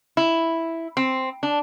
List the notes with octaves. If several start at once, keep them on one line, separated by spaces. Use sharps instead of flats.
E4
C4
D4